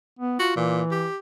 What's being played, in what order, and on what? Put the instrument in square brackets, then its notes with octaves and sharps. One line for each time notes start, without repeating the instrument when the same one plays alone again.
[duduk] B3
[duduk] F4 [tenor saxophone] F#4
[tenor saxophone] A#2 [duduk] E3
[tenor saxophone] G4